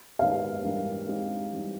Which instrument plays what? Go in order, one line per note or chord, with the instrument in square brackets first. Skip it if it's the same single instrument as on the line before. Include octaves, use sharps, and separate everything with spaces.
[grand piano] G#2 D#3 G#3 B3 [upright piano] F5
[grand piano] G#2 E3 G3 A#3 D4
G#3 C4 D#4 G4
E3 G3 C4 D#4